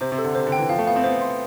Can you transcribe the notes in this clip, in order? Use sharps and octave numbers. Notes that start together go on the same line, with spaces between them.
C3 C5
C3
A4
D3
C3 C5
D3
G5
E3
F3 F5
A3
B3 F5
C4
B3 C5
C6